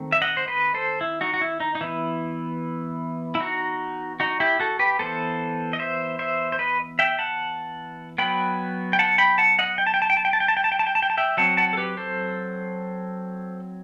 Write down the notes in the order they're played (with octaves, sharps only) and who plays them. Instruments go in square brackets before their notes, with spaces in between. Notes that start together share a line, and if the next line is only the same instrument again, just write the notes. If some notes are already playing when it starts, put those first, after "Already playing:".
Already playing: [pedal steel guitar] D#3 A3 C4
E5
D#5 F#5
C5
B4 D#5
A4 C5
E4
D#4 F#4
F#4
E4
D#4
D#4
E3 B3 E4
E4
D#4 F#4
D#4 F#4
E4 G4
F#4 A4
G4 B4
E3 B3 A4 C5
D#5
C5 E5
C5 E5
C5
B4 D#5
E5 G5
F#5 A5
F#3 B3 G5 B5
G5
F#5 A5
G5 B5
F#5 A5
D#5 F#5
G5
A5
G5
A5
G5
A5
G5
A5
G5
A5
G5
A5
G5
A5
G5
A5
G5
A5
E5 G5
F#3 C4 F#5 A5
F#5 A5
A4
G4 B4
A4 C5